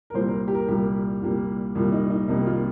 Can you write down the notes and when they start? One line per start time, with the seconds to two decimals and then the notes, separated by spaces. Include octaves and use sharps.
0.10 A#4
0.14 C2 A#2 G3 A#3 C5
0.28 A#4
0.48 G4
0.54 A#4
0.68 C2 A#2 G3 A#3 G4
1.21 C2 A#2 G3 A#3
1.75 C2 A#2 G3 A#3
1.92 D#4
2.10 D#4
2.28 C2 C3 D#3 G3 A#3 D#4
2.46 F4